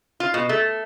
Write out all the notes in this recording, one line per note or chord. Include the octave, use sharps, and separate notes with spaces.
F4
B2
A3